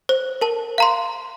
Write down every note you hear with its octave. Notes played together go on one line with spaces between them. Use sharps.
C5
A#4 A5
F5 A#5 C6